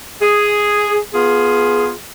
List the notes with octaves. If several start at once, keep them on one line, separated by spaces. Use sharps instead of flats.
G#4
B3 F4 G#4